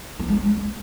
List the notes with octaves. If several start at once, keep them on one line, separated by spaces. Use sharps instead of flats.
B3
G#3